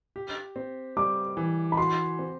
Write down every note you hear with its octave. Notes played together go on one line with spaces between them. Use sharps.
G4
C4
G3 D6
E3
B5
F#4 C6
C4